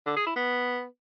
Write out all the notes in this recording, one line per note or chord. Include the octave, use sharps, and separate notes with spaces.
D3
G#4
E4
B3